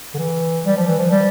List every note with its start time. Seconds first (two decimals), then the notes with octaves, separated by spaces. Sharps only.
0.14 D3
0.18 E3
0.65 G3
0.77 F3
0.87 E3
0.99 F3
1.11 G3